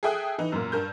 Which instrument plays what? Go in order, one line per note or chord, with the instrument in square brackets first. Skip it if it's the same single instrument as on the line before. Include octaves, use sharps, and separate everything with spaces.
[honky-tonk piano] G#4 A4 E5 G5 D#6 F#6
E3 D#4
F#2 A#2
G2 A#4 G6